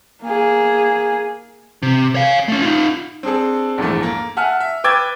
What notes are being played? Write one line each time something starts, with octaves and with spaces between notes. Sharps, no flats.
A#3 G#4
C3
C#5 F5
A3 C#4
D#4 F4
C4 D4 G#4 A4
A#1 E2 G#2 E3 F3 A3
A#3
E5 F#5 G#5 A5 F6
E5
B4 G5 D6 E6 G#6 A6